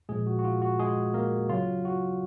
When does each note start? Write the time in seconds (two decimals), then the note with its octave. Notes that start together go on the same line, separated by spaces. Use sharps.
0.09 A#2 F3 G#3 G#4
0.27 F#4
0.39 F#4
0.44 F4
0.62 F#4
0.79 G#3 G#4
1.14 A#3 A#4
1.49 C#3 F#3 F4
1.85 F#4